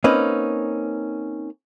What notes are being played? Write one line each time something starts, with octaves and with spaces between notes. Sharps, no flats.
A#3 C4 C#4 D#4 B4